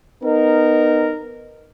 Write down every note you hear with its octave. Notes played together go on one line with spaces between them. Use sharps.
B3 D#4 A#4